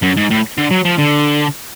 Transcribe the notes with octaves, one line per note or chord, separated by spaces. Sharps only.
F#2
G#2
A2
D3
F#3
F3
D3